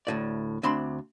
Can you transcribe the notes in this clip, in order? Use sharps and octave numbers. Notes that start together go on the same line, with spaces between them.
D2 A2 D5
D2 C4 D4 B5 C6